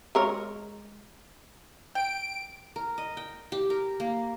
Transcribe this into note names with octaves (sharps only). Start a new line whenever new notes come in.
G#3 A#4 C#5
G5 D7
A#4
D#5
G5
G4
A#4
A#3